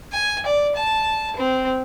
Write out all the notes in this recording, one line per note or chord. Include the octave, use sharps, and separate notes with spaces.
G#5
D5
A5
C4